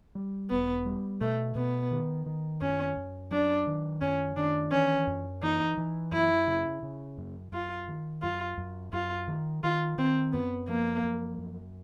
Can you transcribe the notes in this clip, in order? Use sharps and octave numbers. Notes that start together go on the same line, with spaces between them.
G3
E1 B3
G3
B2 A3
B2 B3
D#3
D#3
F#2 C#4
F#2
F#3 D4
D#3
F#2 C#4
D#3 D4
E3 C#4
F#2
E3 D#4
E3
F#2 E4
C#3
C#3
F#2
F#2 F4
D#3
F#2 F4
F#2
F#2 F4
D#3
D#3 F4
D#3 C4
F#2 B3
F3 A#3
F#2
F#2